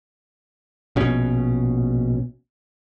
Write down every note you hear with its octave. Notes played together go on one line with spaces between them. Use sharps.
A#1 B2 C#4